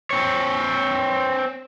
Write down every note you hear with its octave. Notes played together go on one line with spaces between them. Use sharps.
C4 C#5